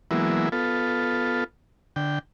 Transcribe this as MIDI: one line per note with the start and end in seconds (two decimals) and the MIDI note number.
0.11 0.49 52
0.11 0.49 54
0.11 0.49 56
0.11 0.49 58
0.11 0.49 59
0.11 0.49 64
0.52 1.44 59
0.52 1.44 65
0.52 1.44 69
1.96 2.19 50
1.96 2.19 79